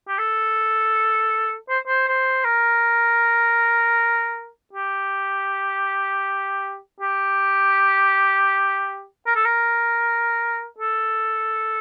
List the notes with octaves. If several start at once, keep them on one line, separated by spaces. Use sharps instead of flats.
G4
A4
C5
C5
C5
A#4
G4
G4
A#4
A4
A#4
A4